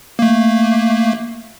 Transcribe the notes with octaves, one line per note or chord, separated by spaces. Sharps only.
A3 A#3